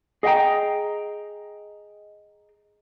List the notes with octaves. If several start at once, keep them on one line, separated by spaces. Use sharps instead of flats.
G#4 D#5 E5 F#5 G5 A#5